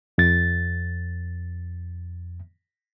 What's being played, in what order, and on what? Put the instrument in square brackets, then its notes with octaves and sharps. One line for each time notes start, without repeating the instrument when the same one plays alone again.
[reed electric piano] F2 A6